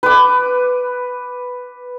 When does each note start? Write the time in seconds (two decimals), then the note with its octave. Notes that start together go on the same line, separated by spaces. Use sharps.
0.03 B4 D6